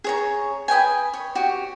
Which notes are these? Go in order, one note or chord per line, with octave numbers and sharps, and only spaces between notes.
G#4 C#5 A#5
B4 D#5 G5 G#5
C#5
F#4 G4